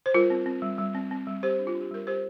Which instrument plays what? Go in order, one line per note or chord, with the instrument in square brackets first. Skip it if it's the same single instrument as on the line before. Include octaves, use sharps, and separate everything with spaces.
[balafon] C5
G3 F4 A#4
C4
C4
G3
G3
C4
C4
G3
G3 G4 C5
D4
F4
D4
G4
G3 A#4
G3 G4 C5